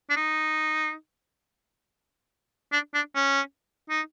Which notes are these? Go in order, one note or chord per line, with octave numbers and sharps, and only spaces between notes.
D4
D#4
D4
D4
C#4
D#4